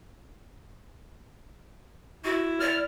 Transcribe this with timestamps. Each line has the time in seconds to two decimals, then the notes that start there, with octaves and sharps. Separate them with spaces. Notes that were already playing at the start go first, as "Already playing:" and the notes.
2.24 E4 F#4
2.60 D5 F6